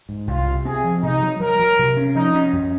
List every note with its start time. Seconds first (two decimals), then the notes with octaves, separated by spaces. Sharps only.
0.09 G#2
0.27 C2 F4
0.47 C3
0.65 C4 G#4
0.84 F3
1.03 C3 D#4
1.21 F#3
1.40 F#3 A#4
1.59 F#3
1.79 C3
1.97 C#4
2.15 F3 D#4
2.35 C#4
2.53 F#2